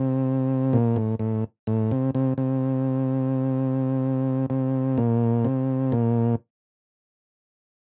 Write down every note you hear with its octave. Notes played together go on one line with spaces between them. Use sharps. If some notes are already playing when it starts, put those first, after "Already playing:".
Already playing: C3
A#2
A2
A2
A2
C3
C3
C3
C3
A#2
C3
A#2